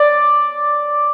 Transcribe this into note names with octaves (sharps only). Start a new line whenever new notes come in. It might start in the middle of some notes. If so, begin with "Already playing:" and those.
Already playing: D5